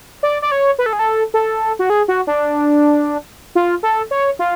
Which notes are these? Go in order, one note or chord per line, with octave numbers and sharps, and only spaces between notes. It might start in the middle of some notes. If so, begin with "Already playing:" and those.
D5
D5
C#5
B4
A4
G#4
A4
A4
F#4
G#4
F#4
D4
F4
A4
C#5
F4